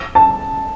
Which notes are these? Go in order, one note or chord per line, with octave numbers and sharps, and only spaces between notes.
A5